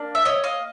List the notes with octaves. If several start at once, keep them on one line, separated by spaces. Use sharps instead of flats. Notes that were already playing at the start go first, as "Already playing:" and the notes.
Already playing: A#3 D4
E5
C#5 D#5
D#5 F5